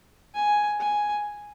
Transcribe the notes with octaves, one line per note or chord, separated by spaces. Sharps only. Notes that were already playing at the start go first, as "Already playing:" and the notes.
G#5
G#5